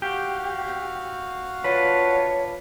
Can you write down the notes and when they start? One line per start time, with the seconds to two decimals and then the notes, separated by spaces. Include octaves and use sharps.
0.02 F#4 G4 F5
0.68 C4
1.64 D4 F4 B4 C#5